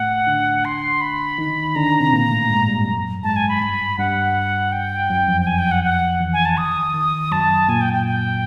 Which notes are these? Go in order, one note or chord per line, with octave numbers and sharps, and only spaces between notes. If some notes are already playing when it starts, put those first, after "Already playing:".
Already playing: A2 A3 F#5
D3 D4
C6
B5
D#3 D#4
D3 D4 A#5
C3 C4
A#2 A#3
A2 A3
G#2 G#3
G2 G3
F#2 F#3
G#2 G#3 A5
G#5
B5
G2 G3
G2 G3 F#5
G5
F#2 F#3
F2 F3
G5
G#5
G5
F#5
F#5
E2 E3
G#5
A5
D#3 D#6
D#3
F#2 F#3 A5
A#2 A#3 G#5
G5
G5
G5